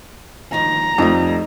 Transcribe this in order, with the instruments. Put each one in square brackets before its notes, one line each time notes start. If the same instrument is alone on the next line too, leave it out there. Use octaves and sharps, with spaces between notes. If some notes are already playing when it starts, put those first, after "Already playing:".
[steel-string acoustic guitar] D#3 F3 [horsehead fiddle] A#5
[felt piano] F2 [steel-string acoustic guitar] G3 A3 [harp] D#4